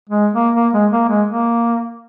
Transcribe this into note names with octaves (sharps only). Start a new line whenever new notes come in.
G#3
A#3
A#3
G#3
A#3
G#3
A#3